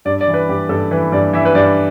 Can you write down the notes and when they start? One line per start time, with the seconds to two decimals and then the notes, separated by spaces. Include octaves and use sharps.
0.05 G2 D5
0.21 D5
0.28 E3
0.34 B4
0.49 G2 G4
0.69 G2 A4
0.91 E3 B4
1.12 G2 D5
1.33 E3 E5
1.45 B4
1.55 G2 D5